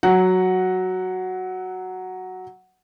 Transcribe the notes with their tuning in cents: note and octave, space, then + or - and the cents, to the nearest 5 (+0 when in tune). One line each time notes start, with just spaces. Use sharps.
F#3 +0 F#5 +0